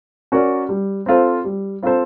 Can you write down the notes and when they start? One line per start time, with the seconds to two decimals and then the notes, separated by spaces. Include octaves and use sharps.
0.32 C#4 F#4 A#4 D5
0.69 G3
1.06 C4 F4 A4 C5
1.45 G3
1.83 C4 F4 A4 C5